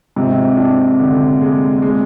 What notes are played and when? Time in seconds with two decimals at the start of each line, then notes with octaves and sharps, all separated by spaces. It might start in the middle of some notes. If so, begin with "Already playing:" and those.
0.16 G#2 C3 F3
0.57 D4
0.99 D3
1.41 G#3
1.82 G#3